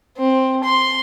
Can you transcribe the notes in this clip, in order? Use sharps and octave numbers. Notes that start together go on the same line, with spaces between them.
C4
C6